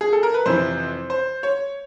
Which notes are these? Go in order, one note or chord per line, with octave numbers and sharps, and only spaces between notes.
G#4
A4
A#4
B4
F2 C3 E3 C5
C5
C#5